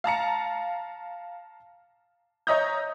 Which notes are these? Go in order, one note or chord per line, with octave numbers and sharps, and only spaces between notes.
F5 A5 A#5 C#7
C#5 D#5 E5 A#5 D#6 G6